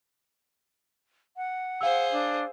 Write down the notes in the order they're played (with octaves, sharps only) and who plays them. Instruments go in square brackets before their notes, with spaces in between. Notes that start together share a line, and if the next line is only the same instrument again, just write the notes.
[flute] F#5
[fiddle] G#4 C5 [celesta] F5 E6
[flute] D4